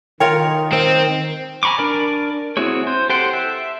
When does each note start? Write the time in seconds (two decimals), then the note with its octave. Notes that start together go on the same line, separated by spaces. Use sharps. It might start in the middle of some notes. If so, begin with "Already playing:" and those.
0.20 D#3 F4 A#4 C#5 G5
0.73 C4
1.63 G#5 A#5 B5 C#6 D6
1.78 D4 A#4 D5
2.57 C4 E4 F#4 G#4 C#5
2.87 C5
3.10 G4 A4 C5 F#5 G5
3.33 E5